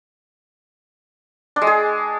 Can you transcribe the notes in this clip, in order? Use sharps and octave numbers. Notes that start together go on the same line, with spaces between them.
D4
G#3
G#4